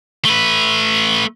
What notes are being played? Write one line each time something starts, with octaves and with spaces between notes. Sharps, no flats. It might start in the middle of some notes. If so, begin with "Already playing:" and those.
A3 B4